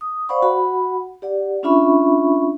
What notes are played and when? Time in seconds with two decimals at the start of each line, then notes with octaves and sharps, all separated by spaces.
0.01 D#6
0.29 C5 D5 F5 F#5 B5 C#6
0.42 F#4 F#5 B5
1.22 G4 D5 F#5
1.63 C#4 D4 F4 E5 B5 C#6